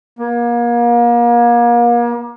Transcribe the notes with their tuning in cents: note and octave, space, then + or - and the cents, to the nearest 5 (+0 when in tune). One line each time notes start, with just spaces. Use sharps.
A#3 +35